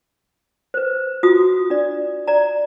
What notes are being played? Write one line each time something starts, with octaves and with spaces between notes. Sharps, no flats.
B4 C5
F4 F#4 D#6
D4 D5
D5 A#5